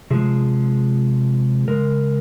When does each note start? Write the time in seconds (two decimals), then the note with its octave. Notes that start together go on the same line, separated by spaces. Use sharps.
0.11 C3 F3 G#3 G#4
1.68 C#3 G#3 A#4